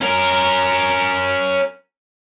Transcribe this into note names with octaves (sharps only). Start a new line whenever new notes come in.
C#4 A#4